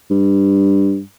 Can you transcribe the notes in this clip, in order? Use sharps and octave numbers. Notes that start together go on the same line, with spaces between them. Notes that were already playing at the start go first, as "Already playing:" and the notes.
G2